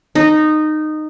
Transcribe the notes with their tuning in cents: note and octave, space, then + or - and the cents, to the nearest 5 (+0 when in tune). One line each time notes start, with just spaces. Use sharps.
D#4 -15